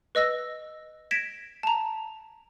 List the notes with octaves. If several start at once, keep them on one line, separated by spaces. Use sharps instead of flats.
B4 D#5 E6 A#6
G#6 A#6 B6 D7 E7
A5 A#5